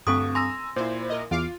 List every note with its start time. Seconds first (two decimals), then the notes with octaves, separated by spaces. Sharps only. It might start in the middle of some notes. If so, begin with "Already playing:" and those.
0.07 D2 G2 C4 A4 C#6 D#6
0.35 G#5 A#5 C6 E6 A#6
0.76 A#2 E4 C5
1.09 A#4 D#5
1.31 E2 F4 F5 D6